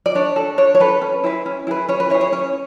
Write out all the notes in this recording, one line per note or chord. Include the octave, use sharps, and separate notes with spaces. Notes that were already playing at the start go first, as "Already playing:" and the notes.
D5
D4 C#5
A4
D4 C#5
C#5
A4 B4
C#4
E4 G#4 B4
C#4
E4 G#4 B4
C#4 C#5
B4
E4 G#4 C#5
C#5
C#4 C#5